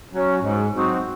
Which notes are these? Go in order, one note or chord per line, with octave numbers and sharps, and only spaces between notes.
F#3 C#4
G#2
F#3 C4 D#4 F#4